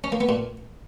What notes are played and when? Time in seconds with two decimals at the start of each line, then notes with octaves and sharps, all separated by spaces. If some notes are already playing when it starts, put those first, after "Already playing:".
0.04 C#4
0.12 A#3
0.21 B3
0.29 A#2